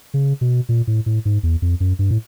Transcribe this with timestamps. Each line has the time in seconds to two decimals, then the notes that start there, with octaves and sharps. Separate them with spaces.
0.14 C#3
0.41 B2
0.69 A#2
0.87 A2
1.06 A2
1.25 G#2
1.43 E2
1.62 F2
1.80 F#2
1.99 G2
2.11 A2